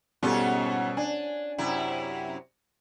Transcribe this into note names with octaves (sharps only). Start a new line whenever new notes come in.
G#2 B2 G3 C#4 F4 A4
D4 G#5
F#2 C3 E4